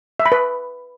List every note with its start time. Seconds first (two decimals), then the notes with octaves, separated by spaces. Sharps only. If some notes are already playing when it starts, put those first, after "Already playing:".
0.20 E5
0.26 B5
0.32 B4